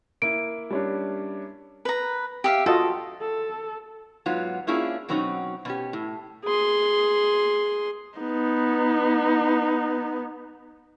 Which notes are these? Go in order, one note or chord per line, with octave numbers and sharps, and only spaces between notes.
A#3 E4 D7
G3 C#4 D4
B4 A#5
G4 E5 F5
F4 F#4 A4 D#5
A4
G#2 F#3 B3 F4
A#3 C#4 D4 E4 F4 G#4
B2 F#3 C4 C#4 D#4 F#4
B2 C#4 G4
A2
G#4 C6
B3 D#4